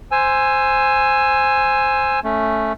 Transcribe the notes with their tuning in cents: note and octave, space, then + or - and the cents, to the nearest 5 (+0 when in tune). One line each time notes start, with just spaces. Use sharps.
C5 +5 G#5 +0 E6 +15
A3 +0 C#4 +0